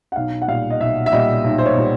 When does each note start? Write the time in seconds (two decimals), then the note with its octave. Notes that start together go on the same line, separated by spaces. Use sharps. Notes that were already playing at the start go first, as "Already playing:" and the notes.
0.12 F#5
0.16 B1 F5
0.42 F#5
0.48 A#2 G3 F5
0.70 D#5
0.80 B1 E5
1.06 E5
1.12 A#2 G3 D#5
1.44 B1
1.58 C5
1.66 C#5
1.76 A#2 G3